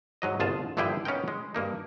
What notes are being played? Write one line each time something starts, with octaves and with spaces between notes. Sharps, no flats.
G#2 F#3 D#5
G1 C2 F4 G#4 A5
A#1 G2 D3 E4 G#4 G5
B3 C#4 D#4 A#4 G5
G#3
G2 A#3 D#4